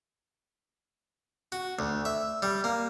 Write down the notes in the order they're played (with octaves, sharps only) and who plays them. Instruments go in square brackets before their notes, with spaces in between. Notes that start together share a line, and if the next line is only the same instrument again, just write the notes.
[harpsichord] F#4
D2
E5
G3
A#3